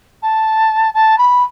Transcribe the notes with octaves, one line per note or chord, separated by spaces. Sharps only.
A5
A5
B5